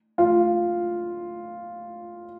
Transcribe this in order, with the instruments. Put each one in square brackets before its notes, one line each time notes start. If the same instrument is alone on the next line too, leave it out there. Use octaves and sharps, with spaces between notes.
[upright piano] F4